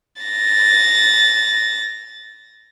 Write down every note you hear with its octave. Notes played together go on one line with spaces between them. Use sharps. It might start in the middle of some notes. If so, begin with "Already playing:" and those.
A6 A#6